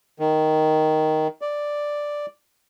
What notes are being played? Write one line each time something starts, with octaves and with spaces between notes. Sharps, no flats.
D#3
D5